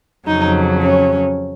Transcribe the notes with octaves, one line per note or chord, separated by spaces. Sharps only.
F2 C#3 F#3 D#4
C#4